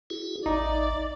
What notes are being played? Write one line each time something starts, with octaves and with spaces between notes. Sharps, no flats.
E4 F#4 G#4
A1 D#4 D5